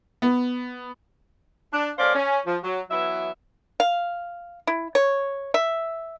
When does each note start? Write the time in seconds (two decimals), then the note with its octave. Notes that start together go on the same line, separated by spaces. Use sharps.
0.22 B3
1.72 D4
1.98 A3 C#4 A#4 C5 D5 F5
2.15 C#4
2.46 F3
2.62 F#3
2.90 E3 F#3 B3 E4 E5
3.80 F5
4.67 E4
4.95 C#5
5.54 E5